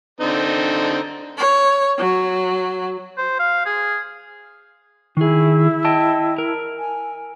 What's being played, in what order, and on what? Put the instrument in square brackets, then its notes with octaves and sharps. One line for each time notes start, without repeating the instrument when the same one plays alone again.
[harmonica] D3 C4 D#4
[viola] C#5
F#3
[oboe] C5
F5
G#4
[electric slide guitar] D#3 G#4 [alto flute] E4
[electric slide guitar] D#5 G5 A5
A#4
[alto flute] G#5